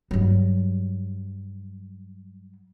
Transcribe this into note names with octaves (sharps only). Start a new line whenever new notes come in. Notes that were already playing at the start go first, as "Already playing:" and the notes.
G2 F#3